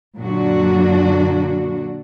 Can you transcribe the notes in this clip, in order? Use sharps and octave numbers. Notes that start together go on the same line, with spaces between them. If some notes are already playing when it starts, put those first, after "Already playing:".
F#2 A#2 D3 F#3 D4 F#4